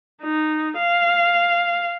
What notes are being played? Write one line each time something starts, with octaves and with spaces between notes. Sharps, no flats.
D#4
F5